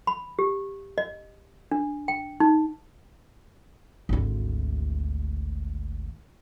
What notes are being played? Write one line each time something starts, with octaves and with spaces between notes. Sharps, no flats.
B5
G4
D#5
D4
G5
D#4
G#1 D2